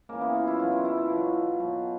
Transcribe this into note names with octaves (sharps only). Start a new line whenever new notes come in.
C#3 E3 A#3
B3
F4
E4
B2 F#3 F4
E4
E4
F4
B2 F#3
B2 F#3